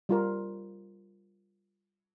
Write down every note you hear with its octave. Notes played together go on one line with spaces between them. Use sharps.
G3 F4 A#4